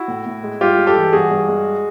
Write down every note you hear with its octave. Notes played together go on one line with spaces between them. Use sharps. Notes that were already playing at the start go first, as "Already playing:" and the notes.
Already playing: E4 F#4
A2
A2
G#3
G2 F4 G4
G#3
G4 A4
E3
G2 F#4 G#4
G2
G#3